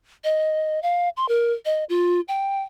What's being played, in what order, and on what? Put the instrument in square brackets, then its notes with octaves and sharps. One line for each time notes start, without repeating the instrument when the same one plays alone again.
[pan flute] D#5
F5
C6
A#4
D#5
F4
G5